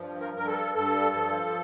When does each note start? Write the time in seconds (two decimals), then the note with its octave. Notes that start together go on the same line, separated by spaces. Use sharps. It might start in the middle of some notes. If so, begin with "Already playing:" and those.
Already playing: G2 F3
0.21 A#4
0.34 G2 A#4
0.47 A4
0.75 G2 A4
1.15 F3